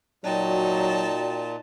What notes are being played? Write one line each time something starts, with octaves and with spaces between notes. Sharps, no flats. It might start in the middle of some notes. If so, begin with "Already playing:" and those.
A#2 F#3 D#4 F#4 D5 G5 A5